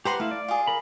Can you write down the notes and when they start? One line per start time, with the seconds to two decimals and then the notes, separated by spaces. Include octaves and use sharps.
0.05 G4 B4 C5 F#5 A#5 C6
0.20 A3 E4 F5
0.31 D5
0.48 F4 G#4
0.67 A#4 B5